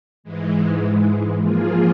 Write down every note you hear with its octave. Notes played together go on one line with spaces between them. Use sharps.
G#2 E3 G#3
F3 A#3 F4 G#4